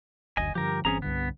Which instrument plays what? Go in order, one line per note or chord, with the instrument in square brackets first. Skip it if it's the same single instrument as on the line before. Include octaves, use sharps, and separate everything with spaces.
[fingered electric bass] F#1 D2 [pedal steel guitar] D#5 G#5
[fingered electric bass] G2 D3 F3 [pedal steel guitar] G4 A#4
[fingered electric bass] G1 E3 C4 [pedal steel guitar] C#4 G#4 A#5
[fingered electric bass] C2 G2 D3 [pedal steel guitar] B3